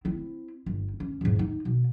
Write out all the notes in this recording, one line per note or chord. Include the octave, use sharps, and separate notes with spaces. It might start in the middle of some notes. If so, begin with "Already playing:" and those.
C4 E4
G1
C#4
E2 G#2
D#4
B2